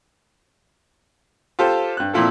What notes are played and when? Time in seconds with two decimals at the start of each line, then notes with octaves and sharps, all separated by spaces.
1.59 F4 G4 A4 C5
1.97 G2 F#6
2.13 A#2 F3 C4 E4 F4 A4